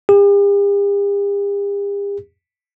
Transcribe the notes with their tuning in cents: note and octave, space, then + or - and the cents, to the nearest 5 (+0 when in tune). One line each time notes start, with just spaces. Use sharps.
G4 +45